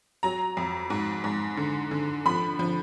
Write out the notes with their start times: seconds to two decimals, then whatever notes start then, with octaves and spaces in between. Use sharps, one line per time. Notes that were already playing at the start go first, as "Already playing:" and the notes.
0.23 F#3 A#5
0.57 F2
0.90 G#2
1.24 G#2
1.57 D3
1.91 D3
2.26 F3 B5
2.59 F3